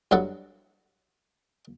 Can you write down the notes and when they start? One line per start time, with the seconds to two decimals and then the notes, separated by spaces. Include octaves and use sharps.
0.11 G2 F#3 E4 A4 F#5